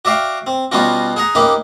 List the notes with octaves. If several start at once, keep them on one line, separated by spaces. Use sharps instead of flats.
F#4 D5 E5 F5 G5
C4
B2 G3 B3 C#4 F4 F#4
G#4 F#5 A#5
A#3 C#4 D#4 G4 B4